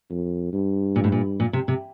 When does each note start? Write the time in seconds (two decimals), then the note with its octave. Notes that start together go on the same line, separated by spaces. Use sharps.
0.10 F2
0.53 G2
0.96 A#2
1.04 A2
1.12 A#2
1.40 A#2
1.53 C3
1.68 C3